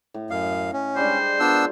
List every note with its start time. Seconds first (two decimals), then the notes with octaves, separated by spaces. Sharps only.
0.14 A2
0.30 F#2 D#5 F5
0.73 C#4
0.96 G3 G#3 D4 C5
1.40 B3 D4 F4 A#4 C#5 E6